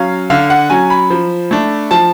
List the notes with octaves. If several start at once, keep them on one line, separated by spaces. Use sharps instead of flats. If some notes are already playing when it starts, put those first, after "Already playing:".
Already playing: F#3 C#4 F5
D3 F5
F#5
F#3 C#4 G#5
B5
F3
A3 D4
F3 A5